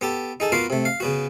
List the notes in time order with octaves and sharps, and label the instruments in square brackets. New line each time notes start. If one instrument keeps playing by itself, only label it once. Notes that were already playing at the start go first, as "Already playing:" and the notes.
[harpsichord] B3 G4 A4
D#4 G#4 A4
A#3 B3 F4 F#4 F5
C3 A3
F5
C#3 B3 F#4